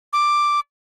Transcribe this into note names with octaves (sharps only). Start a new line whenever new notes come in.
D6